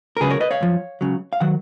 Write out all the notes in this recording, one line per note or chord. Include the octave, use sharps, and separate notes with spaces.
A#4
C#2 C#3 F#3 G#4 B4
A#4 C#5
B4 D#5
C#5 F5
F#2 F3
C#2 C#3 F#3
F5
D#3 F#3 F#5